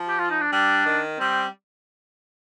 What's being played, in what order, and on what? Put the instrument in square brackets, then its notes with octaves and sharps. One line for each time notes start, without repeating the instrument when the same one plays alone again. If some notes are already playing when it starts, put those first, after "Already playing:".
Already playing: [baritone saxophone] F3
[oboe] G4
F4
D#4
D4
[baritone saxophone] G3 [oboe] D4
[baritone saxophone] D#3
[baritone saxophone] G3 [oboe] C4